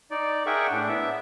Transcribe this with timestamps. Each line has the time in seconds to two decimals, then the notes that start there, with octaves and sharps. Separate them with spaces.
0.11 D#4 D5
0.46 G#4 A#4 E5 F#5 G5 C#6
0.71 A2 D4
0.88 B3 E5